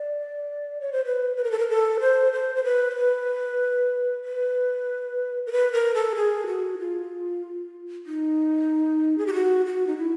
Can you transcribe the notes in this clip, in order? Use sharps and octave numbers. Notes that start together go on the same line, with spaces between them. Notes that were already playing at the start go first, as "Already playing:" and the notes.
Already playing: D5
C#5
C5
B4
B4
A#4
A4
A#4
A4
C5
C5
C5
B4
C5
B4
B4
A#4
B4
A#4
A4
G#4
F#4
F4
D#4
G#4
G4
F#4
F#4
D#4
E4